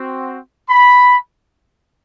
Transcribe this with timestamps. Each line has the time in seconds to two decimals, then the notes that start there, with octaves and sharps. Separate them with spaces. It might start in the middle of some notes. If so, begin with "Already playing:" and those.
Already playing: C4 F#4
0.70 B5